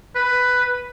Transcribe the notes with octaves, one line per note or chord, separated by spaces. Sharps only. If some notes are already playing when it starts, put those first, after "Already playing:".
B4